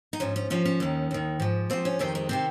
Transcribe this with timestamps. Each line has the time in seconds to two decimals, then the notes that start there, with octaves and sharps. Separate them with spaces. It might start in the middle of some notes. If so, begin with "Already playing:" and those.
0.13 D#4
0.20 G#2 F3 C#4
0.36 C#4
0.50 G#2 F3 C#4
0.65 C#4
0.80 D#2 D#3
1.11 D#2 D#3
1.40 G#2 F3
1.70 G#2 F3 C4
1.85 C#4
1.99 F2 C3 D#3 C4
2.15 G#3
2.29 C3 D#3 C4